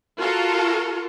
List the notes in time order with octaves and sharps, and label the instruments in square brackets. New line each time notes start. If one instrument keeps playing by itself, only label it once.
[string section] F4 F#4 A4 A#4